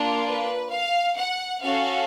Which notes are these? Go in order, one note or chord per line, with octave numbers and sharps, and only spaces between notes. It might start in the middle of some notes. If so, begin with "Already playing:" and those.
Already playing: A#3 D4 F4
B4
F5
F#5
C#4 F#4 A4 F5